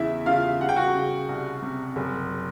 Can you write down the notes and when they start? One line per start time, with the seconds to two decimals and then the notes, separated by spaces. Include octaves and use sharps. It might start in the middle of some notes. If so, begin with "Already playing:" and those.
Already playing: E2 C#3 E4 E5
0.26 C#3 F4 F5
0.60 C#3 F#5
0.69 G5
0.76 F#4 F#5
0.95 C#3
1.29 C2
1.62 C3
1.96 F#1